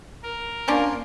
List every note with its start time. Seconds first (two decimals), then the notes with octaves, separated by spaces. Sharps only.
0.23 A#4
0.68 F3 A#3 C#4 D4 C6